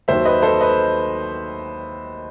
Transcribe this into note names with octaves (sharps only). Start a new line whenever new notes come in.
D#2 D#3 F#3 C5 E5
B4 D#5
A4 C5
B4 D#5